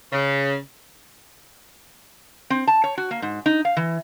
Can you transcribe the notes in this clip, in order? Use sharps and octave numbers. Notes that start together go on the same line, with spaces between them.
C#3
C4
A5
C#5
F#4
A#3
G#2
D#4
F5
E3